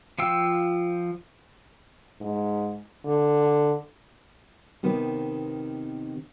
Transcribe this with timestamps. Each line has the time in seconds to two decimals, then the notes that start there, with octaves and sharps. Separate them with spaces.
0.19 F3 F4 G5 E6
2.21 G#2
3.05 D3
4.83 C3 D#3 B3 C4